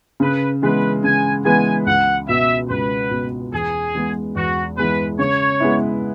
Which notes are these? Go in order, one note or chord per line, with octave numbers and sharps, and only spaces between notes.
C#3 B4
E3 G#3 B3 B4
C#3 G#5
E3 G#3 B3 G#5
C#2 F#5
B2 B3 E5
C#2 B4
B2 B3
E2 G#4
E3 G#3 B3
E2 F#4
E3 G#3 B3 B4
C#3 C#5
G#3 B3 E4